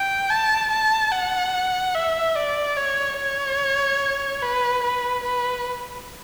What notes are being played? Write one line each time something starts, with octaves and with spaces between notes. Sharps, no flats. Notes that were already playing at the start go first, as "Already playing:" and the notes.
Already playing: G5
A5
A5
F#5
E5
D5
C#5
C#5
B4
B4
B4